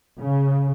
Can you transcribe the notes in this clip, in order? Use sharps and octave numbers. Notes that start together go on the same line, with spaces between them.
C#3